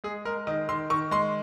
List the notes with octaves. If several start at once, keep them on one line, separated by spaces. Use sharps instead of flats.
G#3 G#4
G#3 A#4
D#3 D#5
D#3 C6
D#3 C#6
G#3 C6